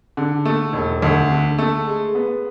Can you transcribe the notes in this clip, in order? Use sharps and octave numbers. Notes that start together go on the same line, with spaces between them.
D3
A3
E1
D2
D3
A3
G#3
B3